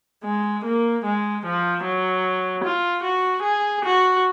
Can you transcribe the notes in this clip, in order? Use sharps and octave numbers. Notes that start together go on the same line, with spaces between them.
G#3
A#3
G#3
F3
F#3
F4
F#4
G#4
F#4